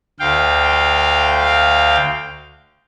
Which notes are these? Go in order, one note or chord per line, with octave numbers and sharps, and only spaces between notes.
D2 F5 G5